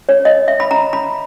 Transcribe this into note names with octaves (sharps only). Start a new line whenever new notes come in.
C#5
D#5
E5
B5
A#5
B5